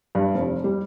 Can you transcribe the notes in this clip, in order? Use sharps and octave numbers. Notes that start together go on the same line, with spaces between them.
G2
F1
G3